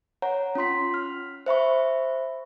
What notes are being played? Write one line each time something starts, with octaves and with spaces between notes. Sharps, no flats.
C#5 F#5 A#5
C#4 F4 C6 B6
F6
C5 E5 B5 C#6